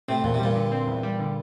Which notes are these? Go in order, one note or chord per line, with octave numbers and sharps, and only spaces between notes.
A2 C3 C4
E2 A#2
C3
G2 A#2 G3
D3
C4
E2
G3
D3